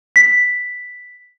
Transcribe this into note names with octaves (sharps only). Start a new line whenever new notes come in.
B6